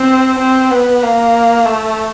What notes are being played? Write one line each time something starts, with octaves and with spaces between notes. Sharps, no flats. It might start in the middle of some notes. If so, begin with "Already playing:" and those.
Already playing: C4
C4
B3
A#3
A3